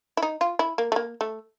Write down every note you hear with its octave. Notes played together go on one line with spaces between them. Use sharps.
E4
D#4
F4
E4
A#3
A3
A#3
A3